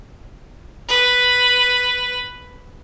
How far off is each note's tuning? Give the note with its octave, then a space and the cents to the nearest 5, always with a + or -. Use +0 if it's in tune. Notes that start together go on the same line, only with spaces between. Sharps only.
B4 +0